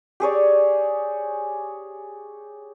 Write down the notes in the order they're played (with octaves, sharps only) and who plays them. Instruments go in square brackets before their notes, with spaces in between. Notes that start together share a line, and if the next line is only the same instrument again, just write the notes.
[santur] G4 G#4 C#5 D5